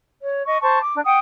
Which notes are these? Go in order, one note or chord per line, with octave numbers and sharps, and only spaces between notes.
C#5
D#5 C#6
C5 A5 C#6
D6
D4
F#5 G5 D#6